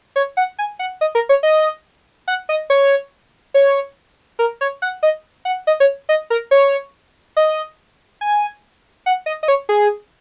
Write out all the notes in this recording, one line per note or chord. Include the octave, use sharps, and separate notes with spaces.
C#5
F#5
G#5
F#5
D#5
A#4
C#5
D#5
F#5
D#5
C#5
C#5
A#4
C#5
F#5
D#5
F#5
D#5
C#5
D#5
A#4
C#5
D#5
G#5
F#5
D#5
D#5
C#5
G#4